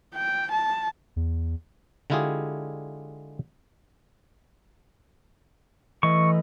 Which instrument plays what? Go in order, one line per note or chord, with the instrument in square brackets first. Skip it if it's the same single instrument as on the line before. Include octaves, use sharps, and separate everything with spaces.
[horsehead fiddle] G5
A5
[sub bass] E2
[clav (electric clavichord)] D3 G#3 E4 F4 G4 G#4
[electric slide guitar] E3 A3 D#5 [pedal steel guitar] C#6